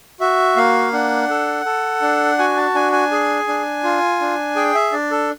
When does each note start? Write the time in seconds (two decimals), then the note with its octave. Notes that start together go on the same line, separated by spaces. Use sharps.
0.20 F#4 E5
0.56 A#3 F5
0.93 D4 F#5
1.30 A4
1.66 A4
2.02 D4
2.39 F#4 G#5
2.57 A5
2.75 D4 G#5
2.92 G#5
3.12 G#4
3.48 D4
3.84 F4
4.21 D4
4.56 G#4 G5
4.75 E5
4.92 D4 D5
5.11 A4